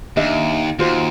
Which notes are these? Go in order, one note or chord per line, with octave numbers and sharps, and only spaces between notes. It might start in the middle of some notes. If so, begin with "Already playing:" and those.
D#2 D4 D#5 E5
D#2 F4 F#4 C5